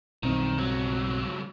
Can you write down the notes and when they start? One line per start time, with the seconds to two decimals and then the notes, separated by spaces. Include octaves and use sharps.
0.23 B1 G2 D#3 C4
0.58 C#2 F#3